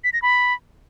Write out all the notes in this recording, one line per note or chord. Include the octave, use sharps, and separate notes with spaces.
B6
A#6
B5